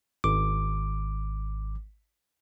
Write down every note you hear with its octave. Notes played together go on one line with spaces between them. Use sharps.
G#1 D6